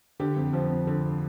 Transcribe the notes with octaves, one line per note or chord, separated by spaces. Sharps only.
D3 G4
F2
F3
F2
D3